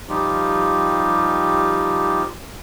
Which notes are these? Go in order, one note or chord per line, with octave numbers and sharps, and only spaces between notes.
F3 G3 D#4 F4 G4